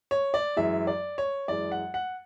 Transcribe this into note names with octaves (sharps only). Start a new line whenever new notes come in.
C#5
D5
F#2 E3 G#3 E5
D5
C#5
F#2 E3 G#3 D5
F#5
F#5